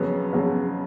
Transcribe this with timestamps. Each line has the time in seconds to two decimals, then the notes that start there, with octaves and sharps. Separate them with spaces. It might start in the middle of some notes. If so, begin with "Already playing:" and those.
Already playing: F2 C#3 F#3 B3
0.32 F2 C#3 F#3 B3